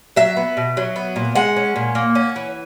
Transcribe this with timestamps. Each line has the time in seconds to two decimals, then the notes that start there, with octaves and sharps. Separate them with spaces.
0.16 F#3 E5
0.37 B3
0.57 B2
0.77 F#3
0.96 B3
1.16 A#2
1.35 G#3 F#5
1.56 C#4
1.76 A#2
1.95 A#3
2.15 C#4
2.36 E3